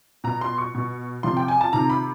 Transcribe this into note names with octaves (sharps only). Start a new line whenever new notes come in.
B2 A#5
C6
C#6
B2
C3 F3 C6
G5
G#5
A5
C3 D#3 A#5
B5